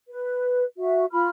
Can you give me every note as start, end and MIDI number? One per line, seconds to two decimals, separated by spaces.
0.07 0.63 71
0.78 1.05 66
0.78 1.05 76
1.11 1.29 65
1.11 1.29 83
1.11 1.29 89